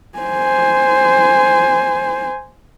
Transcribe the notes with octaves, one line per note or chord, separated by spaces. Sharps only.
C5 G#5